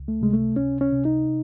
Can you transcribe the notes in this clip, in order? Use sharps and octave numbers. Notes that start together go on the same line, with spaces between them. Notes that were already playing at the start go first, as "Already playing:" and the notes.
Already playing: C#2
A3
C3 G#3
A3
C#2 C#4
C#4
C3
D#4